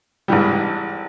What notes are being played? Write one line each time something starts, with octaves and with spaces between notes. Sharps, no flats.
G#1 G#2 E3 G3